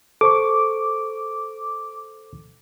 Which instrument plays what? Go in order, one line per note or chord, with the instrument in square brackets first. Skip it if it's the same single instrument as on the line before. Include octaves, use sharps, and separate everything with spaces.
[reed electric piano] A4 C5 C#6 [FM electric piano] D6